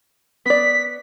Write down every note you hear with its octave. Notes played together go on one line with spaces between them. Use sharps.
B3 D5 B6